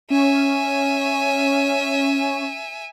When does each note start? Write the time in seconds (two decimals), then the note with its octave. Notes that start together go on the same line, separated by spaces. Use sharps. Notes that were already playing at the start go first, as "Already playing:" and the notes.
0.10 C#4 E5 G#5